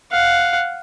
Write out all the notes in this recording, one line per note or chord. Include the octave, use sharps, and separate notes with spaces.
F5 F#5